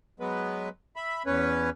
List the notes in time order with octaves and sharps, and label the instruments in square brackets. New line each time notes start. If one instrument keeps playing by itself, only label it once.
[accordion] F#3 G#3 B3 B4
E5 B5
E2 C#4 B4 C#5